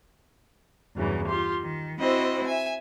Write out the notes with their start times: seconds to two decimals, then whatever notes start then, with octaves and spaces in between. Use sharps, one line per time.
0.95 E2 G2 C#3 E3 F#3
1.26 F4 G4 C6
1.61 D#3
1.98 C4 E4 F#4 C5 D#5
2.46 E5 G#5